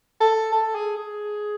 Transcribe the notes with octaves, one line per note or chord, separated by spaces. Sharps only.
A4
A4
G#4
G#4